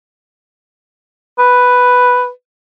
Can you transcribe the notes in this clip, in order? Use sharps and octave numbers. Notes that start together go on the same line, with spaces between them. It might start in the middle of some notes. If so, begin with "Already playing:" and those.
B4